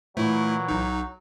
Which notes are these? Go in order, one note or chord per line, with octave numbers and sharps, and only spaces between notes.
A#2 E3 F#3 A3 E4
B1 D#4